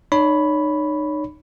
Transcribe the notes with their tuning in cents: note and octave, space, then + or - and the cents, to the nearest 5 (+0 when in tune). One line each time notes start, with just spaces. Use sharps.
D#4 -35 C#5 +20 B5 +0